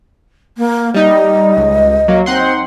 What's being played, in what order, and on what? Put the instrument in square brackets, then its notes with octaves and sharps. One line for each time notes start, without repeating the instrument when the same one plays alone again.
[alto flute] A#3
[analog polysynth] G3 D#4 [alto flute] D#5
[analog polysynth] C#2
F#3 A#3
[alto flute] C4 [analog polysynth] D#4 F#5 C6